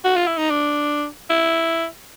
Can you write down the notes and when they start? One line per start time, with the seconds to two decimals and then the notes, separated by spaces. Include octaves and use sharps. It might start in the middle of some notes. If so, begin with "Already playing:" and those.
0.04 F#4
0.16 F4
0.27 E4
0.38 D#4
0.50 D4
1.30 E4